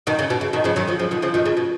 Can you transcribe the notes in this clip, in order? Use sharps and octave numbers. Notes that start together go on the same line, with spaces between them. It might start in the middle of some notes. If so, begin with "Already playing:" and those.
B2 D#3
C#3
B2
C#3
B2 D#3
C#3 F3
D#3 F#3
C#3 F3
C#3 F3
B2 D#3
C#3 F3
B2 D#3
C#3
B2